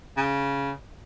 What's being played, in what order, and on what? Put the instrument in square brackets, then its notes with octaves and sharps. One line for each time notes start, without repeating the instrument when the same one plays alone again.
[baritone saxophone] C#3